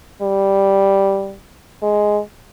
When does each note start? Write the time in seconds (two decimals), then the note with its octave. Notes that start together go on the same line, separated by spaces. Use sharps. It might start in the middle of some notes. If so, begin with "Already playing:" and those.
0.22 G3
1.83 G#3